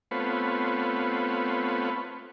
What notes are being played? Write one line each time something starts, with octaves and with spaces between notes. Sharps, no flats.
A3 B3 C4 F4 B4 C#5